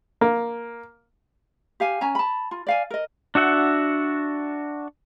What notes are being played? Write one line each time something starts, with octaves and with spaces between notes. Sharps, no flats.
A#3
G4 F5 G#5
C#4 G#5 A#5
A5 B5
F4
D5 F5 G#5
A#4 D#5
D4 F#4 E5 F#5